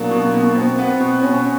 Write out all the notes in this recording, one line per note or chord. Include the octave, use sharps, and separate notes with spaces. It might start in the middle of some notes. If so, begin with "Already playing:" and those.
Already playing: B2 F#3 A#3 D4
B2
B2
B2 C4
B3
B2
B2 C#4